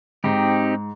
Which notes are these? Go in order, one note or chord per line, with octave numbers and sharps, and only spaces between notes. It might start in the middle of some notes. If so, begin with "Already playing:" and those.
G#2 C4 D#4 G4